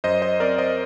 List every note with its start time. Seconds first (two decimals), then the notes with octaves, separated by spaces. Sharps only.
0.04 F#2 C5 D#5
0.22 C5 D#5
0.40 C4 A#4 D5
0.58 C5 D#5